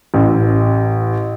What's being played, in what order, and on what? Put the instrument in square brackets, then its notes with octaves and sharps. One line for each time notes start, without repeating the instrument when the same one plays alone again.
[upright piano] A1